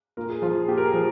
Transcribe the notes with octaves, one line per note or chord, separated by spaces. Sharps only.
A#2 A#4
G#4
F3 F4
G#4
A#2 G4
A#4
G#4
F3